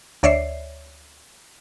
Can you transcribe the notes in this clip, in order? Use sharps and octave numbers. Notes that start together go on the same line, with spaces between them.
D2 C#5 D5 E5 C7